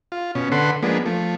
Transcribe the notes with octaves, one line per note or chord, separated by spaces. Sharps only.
F4
B2 C#4
D3 A4 B4 F#5 C6
F3 G#3 A#3 B3 D4
F3 A3